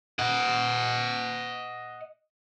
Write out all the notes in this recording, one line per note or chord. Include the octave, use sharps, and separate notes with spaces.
D#5 F#5